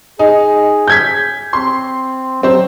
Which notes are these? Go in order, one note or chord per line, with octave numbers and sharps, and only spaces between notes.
D#4 G#4
G6 G#6 B6
C4 C6
F#3 C4 C5